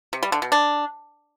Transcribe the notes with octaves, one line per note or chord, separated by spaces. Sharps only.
C3
G3
D3
B2
D4